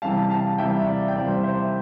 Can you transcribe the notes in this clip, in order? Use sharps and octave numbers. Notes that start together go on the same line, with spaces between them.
C3 E3 G3 F5 A5
F5 A5
C3 E3 G3 E5 G5
E5
D5 F5
G5
C3 E3 G3 D5 F5
C5
D5
C5 E5